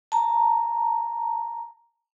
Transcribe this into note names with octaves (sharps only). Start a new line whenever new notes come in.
A5 A#5